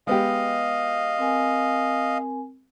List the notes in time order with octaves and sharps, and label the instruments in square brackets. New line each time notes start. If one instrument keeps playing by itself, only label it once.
[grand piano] G#3 B3 G4 [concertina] D#5 F5
[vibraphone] C4 A#4 G#5